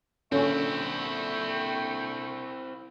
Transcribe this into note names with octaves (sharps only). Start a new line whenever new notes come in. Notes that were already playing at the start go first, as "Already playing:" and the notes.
A#2 D3 C4 C#4 E4 E5 G5 C#6